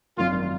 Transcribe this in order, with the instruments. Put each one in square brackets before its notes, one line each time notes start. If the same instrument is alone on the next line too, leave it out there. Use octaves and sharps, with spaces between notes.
[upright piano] G#1 F#2 D#3 [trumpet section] F4